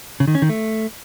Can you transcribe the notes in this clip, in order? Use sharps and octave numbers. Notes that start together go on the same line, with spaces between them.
C#3
D#3
C#4
D#3
A3